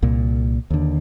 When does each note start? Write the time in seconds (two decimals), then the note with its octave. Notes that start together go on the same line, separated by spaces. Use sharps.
0.02 C2 A#2
0.70 D#2 D3